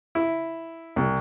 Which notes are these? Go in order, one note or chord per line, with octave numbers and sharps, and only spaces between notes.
E4
C2